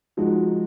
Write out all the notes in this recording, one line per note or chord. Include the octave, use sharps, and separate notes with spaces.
F3 G#3 D#4 F#4